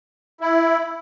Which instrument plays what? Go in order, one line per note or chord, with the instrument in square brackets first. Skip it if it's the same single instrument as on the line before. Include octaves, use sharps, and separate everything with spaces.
[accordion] E4